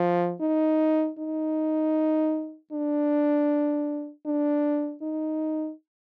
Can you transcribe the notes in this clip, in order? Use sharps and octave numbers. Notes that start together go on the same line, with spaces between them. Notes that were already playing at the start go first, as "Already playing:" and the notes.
Already playing: F3
D#4
D#4
D4
D4
D#4